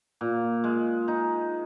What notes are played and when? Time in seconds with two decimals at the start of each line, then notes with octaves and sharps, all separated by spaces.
0.21 A#2
0.64 G#3
1.08 D#4